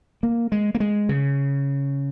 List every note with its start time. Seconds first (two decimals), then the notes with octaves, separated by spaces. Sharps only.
0.23 A#3
0.52 G#3
0.75 A#3
0.80 G#3
1.09 C#3